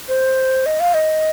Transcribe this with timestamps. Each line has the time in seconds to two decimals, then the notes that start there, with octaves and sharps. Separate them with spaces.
0.08 C5
0.66 D#5
0.80 F5
0.94 D#5